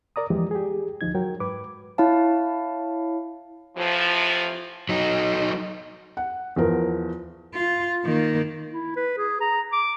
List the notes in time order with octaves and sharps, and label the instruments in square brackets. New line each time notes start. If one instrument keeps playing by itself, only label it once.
[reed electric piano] A#4 D5 A#5 D#6
E2 E3 F3 G#3 G4
G4 G#4
D2 F3 D#4 G#6
F#3 A#4 G5
G#2 B4 D6
[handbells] E4 C#5 F5 A5
[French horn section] A2 C3 E3 F3
[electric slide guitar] F#3 D#4
[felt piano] F#5
E2 F3 A#4
[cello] F4
D#3 A#3
[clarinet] E4
B4
G#4
A#5
D6